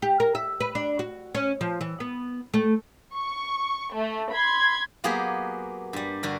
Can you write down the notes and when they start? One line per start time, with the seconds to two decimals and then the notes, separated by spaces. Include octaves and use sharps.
0.02 G4
0.20 A#4
0.35 E5
0.60 B4
0.75 D4
0.99 F#4
1.35 C#4
1.61 F3
1.81 E3
2.00 B3
2.54 A3
3.15 C#6
3.95 A3
4.32 B5 C6 G#6
5.04 F#3 A#3 B3 G4 G#4 B4
5.93 G2 G3
6.23 G2 D3 F#4 A#4